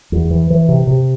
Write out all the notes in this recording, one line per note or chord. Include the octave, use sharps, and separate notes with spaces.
E2
E3
E3
C3
C3